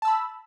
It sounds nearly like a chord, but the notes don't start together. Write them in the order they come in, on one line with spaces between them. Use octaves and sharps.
A5 E6 B5